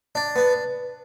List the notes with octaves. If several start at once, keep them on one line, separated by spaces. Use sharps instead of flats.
D4
B3